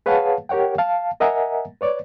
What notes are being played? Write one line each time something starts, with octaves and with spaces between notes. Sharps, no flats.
G#4 B4 C#5 F5 F#5 A5
G4 A#4 C#5 F#5 G5
F5 A5
A#4 D#5 E5 F#5 G#5 A#5
B4 C#5 D5